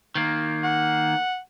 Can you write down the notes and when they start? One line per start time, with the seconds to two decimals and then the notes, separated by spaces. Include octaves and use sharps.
0.15 D#3 A#3
0.64 F#5